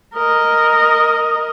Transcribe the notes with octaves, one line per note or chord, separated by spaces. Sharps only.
A#4 D#5